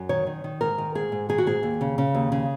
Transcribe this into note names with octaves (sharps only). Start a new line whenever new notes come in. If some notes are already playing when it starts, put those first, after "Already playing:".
Already playing: F#2
D#3 C#5
D#3
D#3
G#2 A#4
D#3
G#2 G#4
G#2
D#3 G#4
F#4
G#2 G#4
D#2
C#3
C#3
D#2
C#3